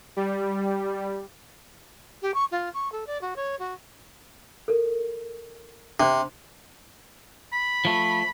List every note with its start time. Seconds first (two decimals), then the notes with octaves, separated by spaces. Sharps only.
0.17 G3
2.22 G4
2.34 C#6
2.52 F4
2.74 C#6
2.92 A4
3.07 D5
3.21 F#4
3.36 C#5
3.59 F#4
4.68 A4 A#4
6.00 C3 D4 C5
7.53 B5
7.85 F3 A3